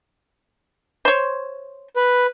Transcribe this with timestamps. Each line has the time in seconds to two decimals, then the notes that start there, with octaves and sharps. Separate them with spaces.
1.05 C5 C#5
1.96 B4